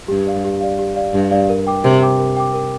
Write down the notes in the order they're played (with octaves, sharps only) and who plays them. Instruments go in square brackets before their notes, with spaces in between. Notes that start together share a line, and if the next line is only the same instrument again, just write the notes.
[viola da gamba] G2 [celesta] G4
[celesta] D5 F5
G4
D5 F5
G4
D5 F5
[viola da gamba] G2 [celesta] G4
[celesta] D5 F5
A#4
G5 D6
[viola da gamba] C3 [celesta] A#4
[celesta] G5 D6
A#4
G5 D6
A#4